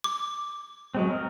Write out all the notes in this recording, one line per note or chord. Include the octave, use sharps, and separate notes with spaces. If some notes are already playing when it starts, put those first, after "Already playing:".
D6
F#3 G#3 C4
A#4